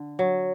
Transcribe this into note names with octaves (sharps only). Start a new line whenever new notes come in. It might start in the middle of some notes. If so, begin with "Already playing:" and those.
Already playing: D3
F#3